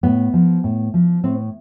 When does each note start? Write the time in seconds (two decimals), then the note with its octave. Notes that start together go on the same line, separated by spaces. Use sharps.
0.03 A2 B3
0.34 F3
0.64 A2
0.94 F3
1.24 A2 C4